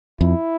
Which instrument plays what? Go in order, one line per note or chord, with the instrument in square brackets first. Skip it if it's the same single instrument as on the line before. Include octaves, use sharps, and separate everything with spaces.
[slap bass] F2 [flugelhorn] E4